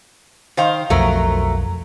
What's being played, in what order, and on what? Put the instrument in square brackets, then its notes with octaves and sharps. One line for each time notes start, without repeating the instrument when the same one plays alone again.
[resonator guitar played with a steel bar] D#3 C5 F5
[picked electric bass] B1 F2 [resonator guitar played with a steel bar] F#3 A3 A#4